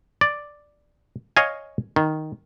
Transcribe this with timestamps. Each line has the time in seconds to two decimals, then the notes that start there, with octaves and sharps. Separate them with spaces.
0.21 D5
1.37 C#5 D#5 F5 G#5
1.96 D#3